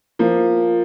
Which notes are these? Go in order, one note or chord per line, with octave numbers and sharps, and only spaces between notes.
F3 A#3